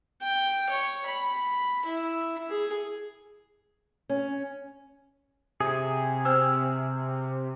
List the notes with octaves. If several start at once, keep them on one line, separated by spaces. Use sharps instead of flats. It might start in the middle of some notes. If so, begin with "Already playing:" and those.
G5
C#5
B5
E4
G#4
C#4
C3 G#4
C4 C5 G5 E6 F6